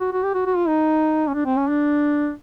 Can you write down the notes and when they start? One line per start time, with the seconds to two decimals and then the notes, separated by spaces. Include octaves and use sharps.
0.01 F#4
0.13 F#4
0.23 G4
0.34 F#4
0.46 F#4
0.57 F4
0.68 D#4
1.28 C#4
1.34 D4
1.46 C4
1.57 C#4
1.69 D4